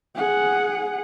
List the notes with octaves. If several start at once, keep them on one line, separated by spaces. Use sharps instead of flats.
G#4 F#5